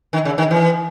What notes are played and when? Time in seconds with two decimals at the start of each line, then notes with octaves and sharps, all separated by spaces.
0.13 D#3
0.25 C#3
0.38 D#3
0.51 E3